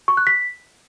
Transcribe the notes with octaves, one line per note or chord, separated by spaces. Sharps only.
C#6
F#6
B6